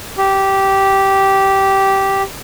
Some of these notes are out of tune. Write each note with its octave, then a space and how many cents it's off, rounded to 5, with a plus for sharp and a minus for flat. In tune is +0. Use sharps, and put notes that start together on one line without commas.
G4 -10